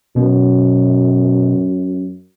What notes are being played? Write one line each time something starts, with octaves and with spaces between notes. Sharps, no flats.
F#2 B2